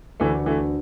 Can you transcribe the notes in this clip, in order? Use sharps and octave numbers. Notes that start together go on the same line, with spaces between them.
D2 D3 E3 A3 B3 F#4
E3 A3